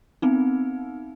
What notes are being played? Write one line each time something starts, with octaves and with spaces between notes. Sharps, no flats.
B3 C4 D#4